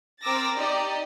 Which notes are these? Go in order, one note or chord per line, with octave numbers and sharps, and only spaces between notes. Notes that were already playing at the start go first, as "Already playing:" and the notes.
C4 A#4 D6 E6 A6 A#6
D#4 G4 D5 D#5